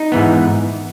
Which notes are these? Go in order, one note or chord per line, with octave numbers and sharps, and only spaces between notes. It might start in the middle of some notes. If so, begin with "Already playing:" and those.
Already playing: D#4
G#2 E3 B3